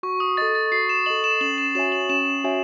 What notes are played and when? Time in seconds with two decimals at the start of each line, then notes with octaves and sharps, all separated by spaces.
0.03 F#4 C#6
0.20 D#6
0.37 A4 D#5 A6
0.55 A6
0.72 F#4 C7
0.89 E7
1.06 A4 D#5 F#7
1.24 E7
1.41 C#4 F#7
1.58 E7
1.75 F#4 C#5 E5 G#5 E7
1.92 F#7
2.09 C#4 E7
2.44 F#4 C#5 E5 G#5